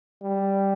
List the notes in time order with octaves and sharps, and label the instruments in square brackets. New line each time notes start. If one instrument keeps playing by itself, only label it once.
[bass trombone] G3